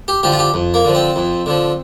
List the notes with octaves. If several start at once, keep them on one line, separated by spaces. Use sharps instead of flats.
G4
D3 F3 G4
F4
G4
F2
A#3
D3 F3
C4
F2
D3 F3